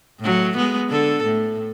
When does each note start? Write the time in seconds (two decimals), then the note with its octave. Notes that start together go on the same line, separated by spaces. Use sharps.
0.20 A2 F#3
0.57 G#3 B3
0.89 D3 A4
1.24 A2